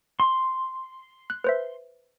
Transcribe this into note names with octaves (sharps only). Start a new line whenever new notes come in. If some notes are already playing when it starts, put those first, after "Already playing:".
C6
F#6
B4 C5 E5